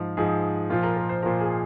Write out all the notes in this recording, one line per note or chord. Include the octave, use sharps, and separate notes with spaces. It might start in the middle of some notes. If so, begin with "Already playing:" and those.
Already playing: G#2 F3 F4
G#2 F3 G#4
A#2 F3 F4
A#4
A#4
C5
A#2 F3 A#4
G#4